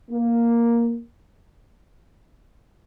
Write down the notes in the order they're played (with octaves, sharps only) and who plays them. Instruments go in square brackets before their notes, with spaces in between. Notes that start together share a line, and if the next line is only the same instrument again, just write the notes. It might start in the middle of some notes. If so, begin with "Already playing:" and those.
[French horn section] A#3